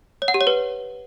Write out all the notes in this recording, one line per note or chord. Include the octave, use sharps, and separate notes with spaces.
C#5
F#5
G4
C#5
B4